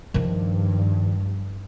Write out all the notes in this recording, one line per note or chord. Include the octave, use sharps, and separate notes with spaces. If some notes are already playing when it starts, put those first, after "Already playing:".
G2 D#3 F3